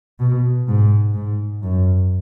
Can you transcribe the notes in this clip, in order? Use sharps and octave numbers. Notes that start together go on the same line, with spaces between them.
B2
G#2
G#2
F#2